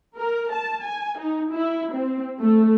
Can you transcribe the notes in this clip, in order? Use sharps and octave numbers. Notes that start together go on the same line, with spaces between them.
A#4
A5
G#5
D#4
E4
C4
A3